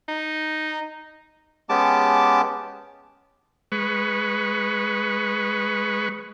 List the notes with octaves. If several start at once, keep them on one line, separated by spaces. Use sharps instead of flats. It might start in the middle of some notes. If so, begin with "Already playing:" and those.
D#4
G#3 B3 C#4 G4 A5 D6
G#3 B4 C#6